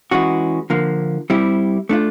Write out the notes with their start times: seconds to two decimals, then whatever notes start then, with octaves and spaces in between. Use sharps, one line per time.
0.11 E3 G#3 C#4 F#4
0.70 D3 F3 A#3
1.30 G3 C4 E4 G4
1.89 A3 D4 F4